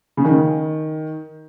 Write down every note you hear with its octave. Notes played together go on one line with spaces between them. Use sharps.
C#3
D#3